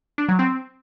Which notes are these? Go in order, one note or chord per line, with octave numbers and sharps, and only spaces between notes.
D4
F#3
C4